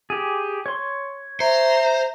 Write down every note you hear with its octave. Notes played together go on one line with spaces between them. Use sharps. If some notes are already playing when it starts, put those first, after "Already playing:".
G4 G#4
C#5 C6
C5 E5 A#5